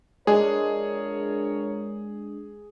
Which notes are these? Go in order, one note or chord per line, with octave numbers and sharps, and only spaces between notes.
F2 G#3 D4 G#4 A#4 C#5